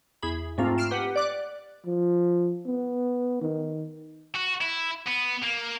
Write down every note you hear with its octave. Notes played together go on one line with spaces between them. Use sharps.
E2 G#4 B5
G#2 A3 A#3 C4 F4
F6 C7 D7 E7
G4 B4 F#5
D5 D6 F#6
F3
B3
D#3
F#4
E4
B3
A#3